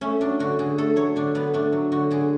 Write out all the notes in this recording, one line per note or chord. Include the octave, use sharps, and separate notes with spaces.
A3 C#4
F#3 D4
D3 F#4
D3 G#4
A3 A4
F#3 C#5
D3 D4
D3 B3
A3 D4
F#3
D3 F#4
D3 G#4